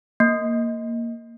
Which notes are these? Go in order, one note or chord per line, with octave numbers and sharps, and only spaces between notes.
A#3